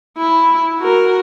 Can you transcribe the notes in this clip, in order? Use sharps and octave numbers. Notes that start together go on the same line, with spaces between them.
E4
F#4 A#4